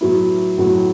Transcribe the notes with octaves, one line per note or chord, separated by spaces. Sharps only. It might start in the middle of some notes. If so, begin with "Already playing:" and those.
A2 F#3 B3 E4
A2 F#3 B3 E4